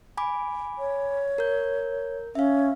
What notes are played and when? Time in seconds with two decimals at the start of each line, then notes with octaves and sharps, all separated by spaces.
0.17 G#5 B5 D6
0.78 C#5
1.38 A#4 G6
2.35 C#4 E5 F5